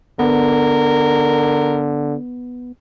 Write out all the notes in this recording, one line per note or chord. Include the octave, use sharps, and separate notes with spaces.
D3 B3 A#4